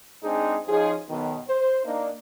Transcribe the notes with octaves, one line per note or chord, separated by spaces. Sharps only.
G#3 C4 D4 D#4 G#4
F3 C#4 D#4 G#4
B1 B2 D#3
C5
A#3 D4 D#4